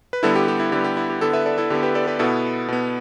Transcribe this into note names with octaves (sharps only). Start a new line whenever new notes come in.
B4
D3 G3 B3 E4 A4
G4
G4
E4
D3 G3 B3 G4
G4
E4
G4
D3 B3 E4 A4
B4 E5
A4 D5
E4 A4
D3 B3 G4
G4 B4
A4 D5
G4 B4
B2 B3 E4 A4
B2 B3